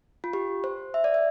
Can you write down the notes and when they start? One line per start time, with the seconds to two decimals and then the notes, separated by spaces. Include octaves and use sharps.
0.24 F4
0.33 G4
0.64 C5
0.94 E5
1.04 D5
1.14 E5